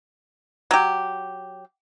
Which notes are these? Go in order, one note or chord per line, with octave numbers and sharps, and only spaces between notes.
F#3 G4